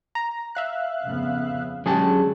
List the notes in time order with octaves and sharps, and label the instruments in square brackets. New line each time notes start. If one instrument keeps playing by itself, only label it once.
[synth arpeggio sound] A#5
E5 F5 F#6
[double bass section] F2 C#3 B3
[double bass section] D3 G#3 [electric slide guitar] F#3 C#4 A5 [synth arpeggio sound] G4 G#4